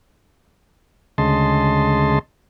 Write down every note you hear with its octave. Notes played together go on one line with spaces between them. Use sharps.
D2 C#3 G#3 D#5 A5 C6